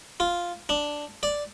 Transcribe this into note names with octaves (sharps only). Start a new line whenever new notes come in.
F4
D4
D5